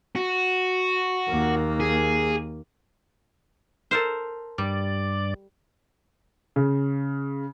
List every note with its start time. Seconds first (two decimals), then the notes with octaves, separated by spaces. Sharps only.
0.15 F#4
1.29 D#2 A#3
1.80 G#4
3.91 A4 A#4 C5
4.58 G2 G3 D5
6.56 C#3